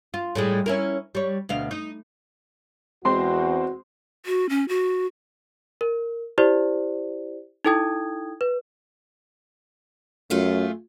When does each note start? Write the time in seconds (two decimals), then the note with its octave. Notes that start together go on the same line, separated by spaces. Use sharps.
0.14 F4
0.35 A2 G3 G#3
0.66 C#4 E4 A#4
1.15 G3 C#5
1.49 D2 B2 F5
1.71 D#4
3.05 E2 G#3 C4 F#4 C5 C6
4.26 F#4
4.49 C#4
4.69 F#4
5.81 A#4
6.38 E4 G4 C5 D5
7.65 D#4 E4 A4 G5 D#6 G#6
8.41 B4
10.30 F#2 A3 F4 G#4